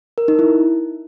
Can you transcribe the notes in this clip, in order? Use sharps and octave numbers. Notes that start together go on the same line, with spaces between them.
A#4
D#4
E4